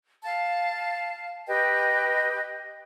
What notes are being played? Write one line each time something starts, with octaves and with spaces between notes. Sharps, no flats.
F5 A5
G4 B4 D#5 G5